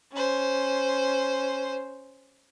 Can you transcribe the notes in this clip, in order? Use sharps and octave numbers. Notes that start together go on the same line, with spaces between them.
C#4 C5